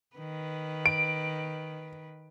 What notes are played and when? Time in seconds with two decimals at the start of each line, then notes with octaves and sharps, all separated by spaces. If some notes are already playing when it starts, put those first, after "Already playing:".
0.16 D#3 B4
0.86 D7